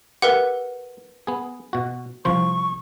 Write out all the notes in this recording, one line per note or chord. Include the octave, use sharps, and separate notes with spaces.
G4 A#4 B4 E5 F#5
B3 G#4
B2 F#4
C2 F3 C5 C#6